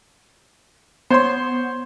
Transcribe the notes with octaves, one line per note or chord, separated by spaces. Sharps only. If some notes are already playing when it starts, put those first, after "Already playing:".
B3 C5 C#5 C6